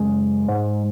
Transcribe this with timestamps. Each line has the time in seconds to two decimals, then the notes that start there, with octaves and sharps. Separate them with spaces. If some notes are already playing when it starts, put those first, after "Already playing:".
Already playing: F#2 C#3 G#3
0.48 G#2